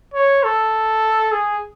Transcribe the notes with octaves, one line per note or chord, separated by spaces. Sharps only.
C#5
A4
G#4